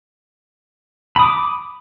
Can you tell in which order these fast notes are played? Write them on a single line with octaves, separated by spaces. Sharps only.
B5 D#6 D6